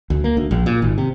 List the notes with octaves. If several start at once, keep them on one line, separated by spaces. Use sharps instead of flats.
D2
A#3
D2
A#1
A#2
G#1
C3